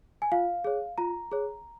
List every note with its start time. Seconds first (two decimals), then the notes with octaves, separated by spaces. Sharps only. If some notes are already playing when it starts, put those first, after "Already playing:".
0.22 G#5
0.32 F4 F5
0.64 G#4 C#5
0.98 F4 A#5
1.31 G#4 C#5